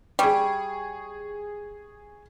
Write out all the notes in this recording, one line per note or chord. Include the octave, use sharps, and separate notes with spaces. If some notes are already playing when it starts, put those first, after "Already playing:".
G3 G#4 C#6